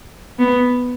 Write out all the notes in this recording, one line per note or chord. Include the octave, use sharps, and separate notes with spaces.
B3